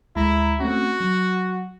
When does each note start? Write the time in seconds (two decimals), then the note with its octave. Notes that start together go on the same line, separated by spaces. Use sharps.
0.16 D2 G#3 E4 A#5
0.60 A3 C4 C#4 F#4
1.00 F#3